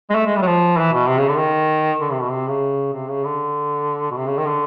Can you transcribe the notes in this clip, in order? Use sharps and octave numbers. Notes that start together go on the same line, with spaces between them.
G#3
A3
G#3
G3
F#3
F3
E3
B2
C3
C#3
D3
D#3
D3
C3
B2
C3
C#3
C3
C#3
D3
B2
C3
C#3
D#3
D3